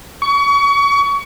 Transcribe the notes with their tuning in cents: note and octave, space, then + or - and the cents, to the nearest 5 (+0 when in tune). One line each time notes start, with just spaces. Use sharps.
C#6 +30